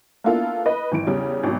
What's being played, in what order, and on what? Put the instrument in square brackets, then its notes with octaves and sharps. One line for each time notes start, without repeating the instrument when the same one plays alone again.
[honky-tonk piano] A#3 B3 D4 E4 F4 A4
B4 D#5
G#1 E3 D7
E2 C#3 G3
G#1 B2 F#3